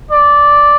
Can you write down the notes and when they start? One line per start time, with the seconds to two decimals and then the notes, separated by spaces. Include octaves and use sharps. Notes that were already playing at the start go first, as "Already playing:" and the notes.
0.11 D5